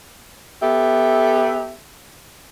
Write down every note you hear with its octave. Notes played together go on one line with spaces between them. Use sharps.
B3 G4 A4 E5